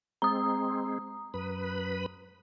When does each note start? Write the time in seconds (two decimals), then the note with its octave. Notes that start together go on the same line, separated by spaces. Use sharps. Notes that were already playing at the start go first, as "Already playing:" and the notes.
0.22 G#3 C4 A#5 D#6
1.34 F#2 B4 B5